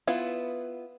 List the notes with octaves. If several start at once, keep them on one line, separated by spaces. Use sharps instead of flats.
B3 E4 F4